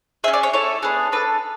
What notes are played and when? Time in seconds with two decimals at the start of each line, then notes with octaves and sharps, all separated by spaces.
0.24 G#4 E5
0.28 C#4
0.33 D5
0.43 C#5
0.53 A3 E4 A4 C#5
0.83 B3 D4 G#4
1.12 D4 A4 B4